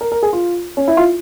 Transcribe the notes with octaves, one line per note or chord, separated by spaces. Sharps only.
A#4
A#4
G#4
F4
C#4
E4
F4